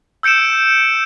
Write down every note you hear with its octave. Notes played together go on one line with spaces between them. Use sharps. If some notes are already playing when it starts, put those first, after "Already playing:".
E6 G6 C#7 D7 E7